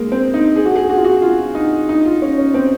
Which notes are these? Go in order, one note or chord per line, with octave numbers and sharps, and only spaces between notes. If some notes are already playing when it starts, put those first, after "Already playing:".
Already playing: G#3 A#3
C4
D#4
G#4
F#4
G#4
F#4
F4
F#4
F4
D#4
D#4
F4
C#4
C#4
C4